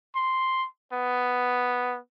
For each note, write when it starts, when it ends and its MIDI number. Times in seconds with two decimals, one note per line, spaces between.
0.15 0.67 84
0.93 1.98 59